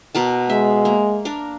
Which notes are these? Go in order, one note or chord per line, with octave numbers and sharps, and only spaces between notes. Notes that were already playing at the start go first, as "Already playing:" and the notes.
B2 A#4 A5
G#3 E5
A#3
D4 A#4